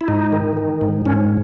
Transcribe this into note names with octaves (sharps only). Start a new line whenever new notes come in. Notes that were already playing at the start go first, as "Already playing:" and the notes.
E4
G#2 D#4
D#3
D#3
G#2
G#2 C#4